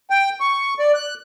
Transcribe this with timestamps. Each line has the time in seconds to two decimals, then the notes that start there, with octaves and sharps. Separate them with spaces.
0.10 G5
0.40 C#6
0.79 D5
0.94 F#6